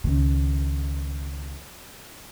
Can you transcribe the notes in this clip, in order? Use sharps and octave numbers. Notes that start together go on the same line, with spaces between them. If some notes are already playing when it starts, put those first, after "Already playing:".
C#2 D#3